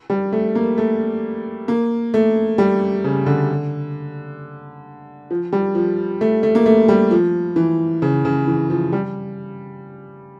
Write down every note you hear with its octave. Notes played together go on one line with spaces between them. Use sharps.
G3
A3
A#3
A3
A#3
A3
G3
C#3
D3
F3
G3
F3
A3
A3
A#3
A3
G3
F3
E3
C#3
C#3
E3
F3
G3